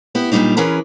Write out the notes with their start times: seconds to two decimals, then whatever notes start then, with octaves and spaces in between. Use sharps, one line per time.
0.15 B3 E4 G4
0.32 F#2 A#2 F3 G3 D4 D#4
0.57 E3 C#4 G#4 A#4 B4